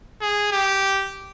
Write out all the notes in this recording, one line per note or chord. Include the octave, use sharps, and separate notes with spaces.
G#4
G4